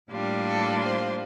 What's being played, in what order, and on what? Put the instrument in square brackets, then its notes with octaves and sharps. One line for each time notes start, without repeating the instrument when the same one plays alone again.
[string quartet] A2 G3 A#3 D4 F4
A4
C5